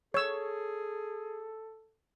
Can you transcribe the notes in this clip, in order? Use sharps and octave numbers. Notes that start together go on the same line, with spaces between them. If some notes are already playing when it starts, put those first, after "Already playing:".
G#4 A4 C#5 E6